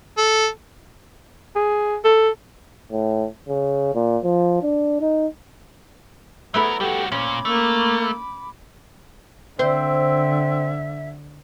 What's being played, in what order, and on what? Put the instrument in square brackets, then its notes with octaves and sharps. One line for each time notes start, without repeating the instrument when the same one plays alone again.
[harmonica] A4
[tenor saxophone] G#4
A4
[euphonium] A2
C#3
A#2
F3
D4
D#4
[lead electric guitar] F#3 A#4 [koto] A3 B3 E4 [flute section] G#4 A#5
[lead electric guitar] G3 F#4 [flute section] G4 A4
[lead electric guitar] A#2 [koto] C#4 [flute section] B5 D6
[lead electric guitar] A3 [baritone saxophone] A#3
[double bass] D3 [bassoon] C4 [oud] C5 [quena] E5